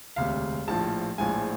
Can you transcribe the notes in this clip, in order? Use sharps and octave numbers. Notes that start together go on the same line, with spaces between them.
E1 D2 C3 F5
A#1 A2 F3 A5
A#1 A2 F3 G#3 G#5